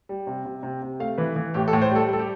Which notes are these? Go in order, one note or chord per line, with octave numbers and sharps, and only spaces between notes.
G3
C3
C3
C3
C3
A3 F5
E3 B4
E3
A2 G4
A4
A2
C5
G3 A4
G3 A4
G4